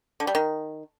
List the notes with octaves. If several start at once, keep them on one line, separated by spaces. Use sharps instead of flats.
D3
G3
D#3